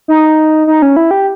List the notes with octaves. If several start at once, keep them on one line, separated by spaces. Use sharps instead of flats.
D#4
D#4
C#4
E4
G4